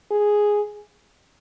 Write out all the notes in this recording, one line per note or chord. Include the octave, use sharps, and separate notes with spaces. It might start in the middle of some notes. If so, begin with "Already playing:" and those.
G#4